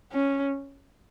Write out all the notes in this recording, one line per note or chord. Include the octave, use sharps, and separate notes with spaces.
C#4